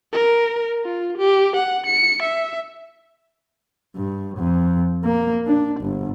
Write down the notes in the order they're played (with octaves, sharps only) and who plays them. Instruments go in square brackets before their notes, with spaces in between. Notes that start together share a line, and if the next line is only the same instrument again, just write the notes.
[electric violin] A#4
F4
G4
F#5
C#7
E5
[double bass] G2
F2
A#3
D4
G1